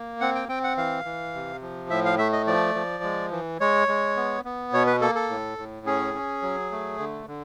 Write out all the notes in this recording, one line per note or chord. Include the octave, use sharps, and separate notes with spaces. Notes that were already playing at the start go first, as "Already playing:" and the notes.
Already playing: A#3
C4 F#5
G5
C4 G5
F#5
E3 F5
E3
C3
F3
A2 E5
F5
A3 E5
D#5
F3 D5
F3
G#3
E3
G#3 C#5
G#3
B3
B3
B2 C#5
B4
A#3 A4
A4
A2
A2
C#4 G#4
C#4
F#3
A3
D3
D3